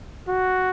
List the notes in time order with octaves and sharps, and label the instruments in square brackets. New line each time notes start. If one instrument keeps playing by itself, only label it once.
[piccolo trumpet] F#4